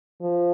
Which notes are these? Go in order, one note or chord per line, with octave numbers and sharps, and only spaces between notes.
F3